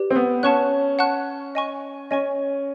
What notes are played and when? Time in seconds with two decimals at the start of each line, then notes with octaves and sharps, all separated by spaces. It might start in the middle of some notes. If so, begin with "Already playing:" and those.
Already playing: G4 B4 D5
0.10 C4
0.15 B3
0.43 C#4 F#5 A5 C#6 F#6
0.99 F#5 A5 C#6 F#6
1.55 D#5 G#5 C#6
2.11 C#4 D#5 G#5 C#6